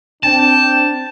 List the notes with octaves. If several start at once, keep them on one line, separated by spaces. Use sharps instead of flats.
C4 D4 G5 A5